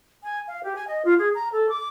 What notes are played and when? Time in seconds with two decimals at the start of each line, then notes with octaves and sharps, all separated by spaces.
0.23 G#5
0.48 F5
0.64 G4
0.75 G#5
0.87 D#5
1.05 F4
1.19 G#4
1.35 A#5
1.52 A4
1.69 D6